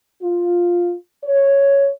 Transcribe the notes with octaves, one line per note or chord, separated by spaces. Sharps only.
F4
C#5